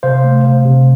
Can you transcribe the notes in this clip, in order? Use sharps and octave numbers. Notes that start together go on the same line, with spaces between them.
C3 C5 F5
A3
C3 C5 F5
C3